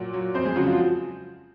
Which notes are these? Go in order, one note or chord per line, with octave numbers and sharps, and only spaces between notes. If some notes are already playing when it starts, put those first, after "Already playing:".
Already playing: A#2 F#3 F#4
F#3
F2 C4 C5
G#3 G#4
C#3 F#3 F#4
F3 F4